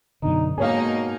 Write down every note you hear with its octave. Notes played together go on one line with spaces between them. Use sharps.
F#2 B2 D3 D#4
G#2 B2 A#3 D#4 G#4 C#5 F5